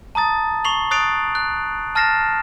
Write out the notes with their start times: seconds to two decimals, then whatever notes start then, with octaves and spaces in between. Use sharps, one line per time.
0.15 A5 A#5 D#6 A6
0.65 C#6 C7 F7 F#7
0.91 D#6 F#6 A6 C7 D7 F7
1.35 F#6
1.95 A5 F6 A6 A#6 C7 E7